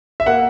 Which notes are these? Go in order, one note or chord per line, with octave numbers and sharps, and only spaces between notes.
E5
A#3 F#5